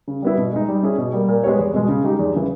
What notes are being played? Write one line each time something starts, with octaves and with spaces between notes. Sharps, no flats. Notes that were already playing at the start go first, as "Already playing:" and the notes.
C#3
G3 B3 E4
B2
G#3 D#4
G3
C#4 E4 G#4
B2
G3 A#3
A#2
G#3 B3 G4 C#5
E2
B2 G#3
C#3
G#3 D#4 G4
E2
C#3 E3